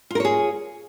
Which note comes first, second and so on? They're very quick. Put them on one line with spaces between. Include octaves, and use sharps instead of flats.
F4 A#4 C#5 G#4